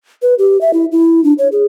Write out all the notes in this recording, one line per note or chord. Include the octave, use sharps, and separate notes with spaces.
B4
G4
E5
E4
E4
D4
C#5
G#4